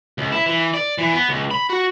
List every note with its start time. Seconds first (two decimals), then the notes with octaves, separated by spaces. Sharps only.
0.18 C#2
0.32 E4
0.46 E3
0.74 D5
0.98 E3
1.13 B3
1.29 C#2
1.51 B5
1.70 F#4